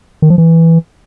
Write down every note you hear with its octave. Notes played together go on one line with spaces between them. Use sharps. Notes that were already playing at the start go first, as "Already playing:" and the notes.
D#3
F3
E3